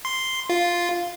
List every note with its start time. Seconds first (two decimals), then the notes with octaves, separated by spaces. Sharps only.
0.05 C6
0.50 F4